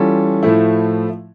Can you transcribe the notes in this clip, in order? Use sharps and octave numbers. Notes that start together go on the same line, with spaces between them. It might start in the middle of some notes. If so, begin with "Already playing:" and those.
Already playing: E3 G3 C#4 F4 A4
A2 F3 A3 E4